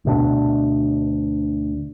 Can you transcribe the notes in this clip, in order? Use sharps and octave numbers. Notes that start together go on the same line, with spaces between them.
D2 B2 D4